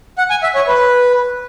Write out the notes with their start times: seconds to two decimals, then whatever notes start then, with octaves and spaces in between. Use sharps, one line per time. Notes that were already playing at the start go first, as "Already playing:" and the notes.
0.18 F#5
0.30 G#5
0.43 E5
0.55 C#5
0.68 B4